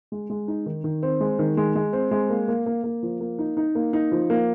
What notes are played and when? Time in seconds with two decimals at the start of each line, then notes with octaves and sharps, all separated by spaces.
0.12 G#3
0.30 G#3
0.48 D#4
0.66 D#3
0.84 D#3
1.03 C4
1.21 G#3
1.39 D#3
1.57 G#3
1.75 G#3
1.93 C4
2.11 G#3
2.30 A#3
2.48 A#3
2.66 A#3
2.84 A#3
3.03 F3
3.20 A#3
3.39 D#4
3.57 D#4
3.75 A#3
3.93 D#4
4.12 F3
4.30 A#3